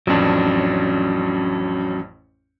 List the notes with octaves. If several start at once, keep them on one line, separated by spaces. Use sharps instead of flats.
A1 F2 F#3 C#4 D4